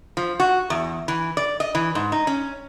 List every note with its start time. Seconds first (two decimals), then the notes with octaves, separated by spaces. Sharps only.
0.17 F3
0.40 F#4
0.70 E2
1.08 E3
1.37 D5
1.60 D#5
1.75 E3
1.95 G#2
2.12 D#4
2.27 C#4